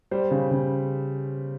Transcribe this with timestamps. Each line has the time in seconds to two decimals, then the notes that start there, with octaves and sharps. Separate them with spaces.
0.11 G3 C5
0.31 C#3
0.51 C#3